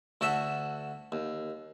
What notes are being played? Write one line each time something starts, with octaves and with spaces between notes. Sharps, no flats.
D2 F#4 A4 E5
D#2